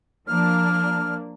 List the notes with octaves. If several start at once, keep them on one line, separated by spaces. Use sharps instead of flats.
F3 A#3 D4 F6